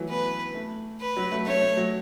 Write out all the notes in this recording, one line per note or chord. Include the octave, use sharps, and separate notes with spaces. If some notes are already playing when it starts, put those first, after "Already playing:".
Already playing: E3 F#3 A3
B3 B4
A3
B4
F#3
A3
A3 C#5
A3
F#3